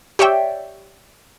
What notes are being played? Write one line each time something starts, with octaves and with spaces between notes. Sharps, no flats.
G4 C#5 D5 E5 G5